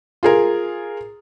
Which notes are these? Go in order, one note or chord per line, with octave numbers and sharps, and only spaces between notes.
F4 G#4 A#4